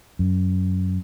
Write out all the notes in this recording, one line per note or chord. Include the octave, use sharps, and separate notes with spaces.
F#2